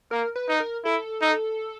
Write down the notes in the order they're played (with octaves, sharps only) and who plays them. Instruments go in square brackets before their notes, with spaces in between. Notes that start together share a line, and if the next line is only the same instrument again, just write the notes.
[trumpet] A#3 [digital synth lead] A#4
[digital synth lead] B4
[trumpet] D#4
[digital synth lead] A#4
[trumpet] E4 [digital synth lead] A4
[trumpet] D#4